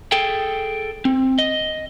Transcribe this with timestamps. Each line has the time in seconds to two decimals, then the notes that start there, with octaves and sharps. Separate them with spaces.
0.12 G#4 A4 G5
1.05 C4
1.38 D#5